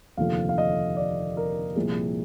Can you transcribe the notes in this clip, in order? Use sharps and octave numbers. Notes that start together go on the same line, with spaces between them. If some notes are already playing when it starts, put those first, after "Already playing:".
F1 D#2 D3 F3 F5
F5
D#5
D5
A#4
C2 A#2 F3 G#4